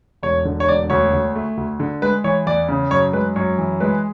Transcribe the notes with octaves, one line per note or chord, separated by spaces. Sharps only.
E1 C#5
D3
C#5
E1 D5
D2 C#5
D2
A3
D2
D3
G#3 B4
E3 C#5
E2 D5
C#3
F#2 C#5
G#3 B4
F#2 C#5
E3
G#3 B4